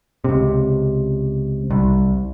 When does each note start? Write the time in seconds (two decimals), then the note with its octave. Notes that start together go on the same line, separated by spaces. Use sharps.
0.24 C#2 C3
1.70 C2